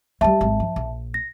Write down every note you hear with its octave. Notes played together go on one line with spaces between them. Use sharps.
G3 G#3 E5 A5
G#1
F3
A#1
A#6